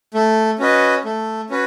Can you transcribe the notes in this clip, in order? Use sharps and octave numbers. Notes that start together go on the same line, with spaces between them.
A3
C#4 F#4 B4 D#5
A3
C#4 F#4 B4